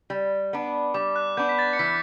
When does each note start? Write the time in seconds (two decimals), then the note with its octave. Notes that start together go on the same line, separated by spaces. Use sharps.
0.10 G3
0.53 B3 D4
0.94 G3 D6
1.16 F#6
1.37 B3 D4 G6
1.49 B6
1.59 A6
1.73 C#7
1.79 E3 B6